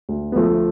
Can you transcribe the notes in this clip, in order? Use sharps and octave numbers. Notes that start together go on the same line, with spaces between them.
D2
B3
D2 F3 A3